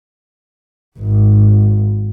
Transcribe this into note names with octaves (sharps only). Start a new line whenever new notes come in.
G#1